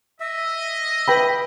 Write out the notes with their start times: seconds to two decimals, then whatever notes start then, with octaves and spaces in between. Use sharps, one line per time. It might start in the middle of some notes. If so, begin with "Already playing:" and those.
0.20 D#5 E5
1.08 B4 G5 B5